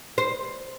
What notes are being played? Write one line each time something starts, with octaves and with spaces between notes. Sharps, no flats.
C5